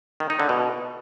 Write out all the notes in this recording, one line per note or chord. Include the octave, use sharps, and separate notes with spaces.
D#3
D#4
D3
B2